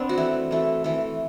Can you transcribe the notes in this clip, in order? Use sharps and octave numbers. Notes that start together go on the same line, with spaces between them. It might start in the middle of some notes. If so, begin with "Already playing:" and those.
Already playing: B3 C4 D4
F#4
E3 A3
E3 A3
E3 A3